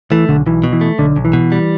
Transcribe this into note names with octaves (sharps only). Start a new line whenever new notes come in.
E3 A3
B1 D3
B1 E3
B2
E3
A3
B1 D3
B1
E3
B2
G3